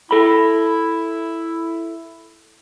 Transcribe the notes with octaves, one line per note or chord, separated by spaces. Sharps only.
E4 A4 B5